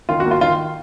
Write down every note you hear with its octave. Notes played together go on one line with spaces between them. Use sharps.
D#3 F4
F#4
A#3
F4
D#3 F4